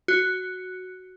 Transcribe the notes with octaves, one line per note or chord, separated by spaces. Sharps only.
F#4